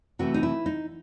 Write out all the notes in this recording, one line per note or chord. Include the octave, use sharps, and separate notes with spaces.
C3 E3 A3 F#4
D#4
E4
D#4